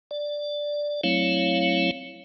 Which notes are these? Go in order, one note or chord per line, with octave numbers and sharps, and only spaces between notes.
D5
F#3 A3 C4 E4 C#5 F5